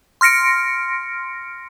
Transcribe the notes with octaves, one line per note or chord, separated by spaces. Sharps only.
C6 F6 A#6 C#7 D7